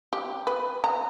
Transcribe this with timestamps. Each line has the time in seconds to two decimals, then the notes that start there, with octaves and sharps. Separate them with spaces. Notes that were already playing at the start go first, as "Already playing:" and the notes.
0.13 G4
0.47 B4
0.84 A#5